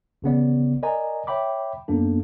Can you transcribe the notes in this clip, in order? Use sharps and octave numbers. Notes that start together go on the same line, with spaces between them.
A1 C#3 B3 D5
A#4 D5 D#5 G#5 A#5
C#5 E5 G5 B5 D6
F#2 A#3 B3 D4 A4